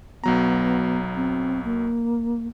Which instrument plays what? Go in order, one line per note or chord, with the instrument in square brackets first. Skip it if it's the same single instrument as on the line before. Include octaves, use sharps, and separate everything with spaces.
[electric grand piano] B1 F#3 A#5 [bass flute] B3
[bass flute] C4
A#3